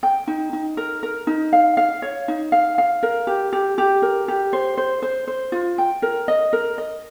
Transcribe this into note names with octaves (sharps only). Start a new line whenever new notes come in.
G5
D#4
D#4
A#4
A#4
D#4
F5
F5
C#5
D#4
F5
F5
A#4
G4
G4
G4
A#4
G4
C5
C5
C5
C5
F4
G5
A#4
D#5
A#4
D#5